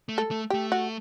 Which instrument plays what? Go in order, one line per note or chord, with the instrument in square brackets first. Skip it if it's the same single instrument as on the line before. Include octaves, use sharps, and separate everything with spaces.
[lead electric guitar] A3
[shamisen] A4
[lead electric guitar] A3
[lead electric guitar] A3 [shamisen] G4
[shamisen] F#4